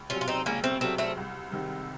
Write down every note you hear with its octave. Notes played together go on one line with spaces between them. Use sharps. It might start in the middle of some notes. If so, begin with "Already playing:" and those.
Already playing: C#2
C3 F#3 C#4 F4
F4
C4 D#4
C#2 A#3 C#4
A3 C4
C3 F#3 A3 C4
A3 C4
C2
C3 D#3